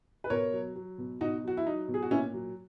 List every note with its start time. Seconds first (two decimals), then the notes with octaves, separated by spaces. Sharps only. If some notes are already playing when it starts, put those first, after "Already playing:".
0.24 B4
0.30 B2 A#4 C#5
0.53 F#3
0.75 F#3
0.98 B2
1.21 B2 D#4 F#4
1.44 F#3 F#4
1.57 E4
1.66 F#3 D#4
1.88 B2
1.94 G#4
2.02 F#4
2.11 A#2 C#4 E4
2.34 F#3